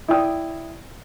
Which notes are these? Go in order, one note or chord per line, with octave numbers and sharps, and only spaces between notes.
E4 D5 G5 D#6